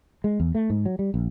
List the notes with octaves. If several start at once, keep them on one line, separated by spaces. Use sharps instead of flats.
G#3
E2
A3
G#2
F#3
G3
A#1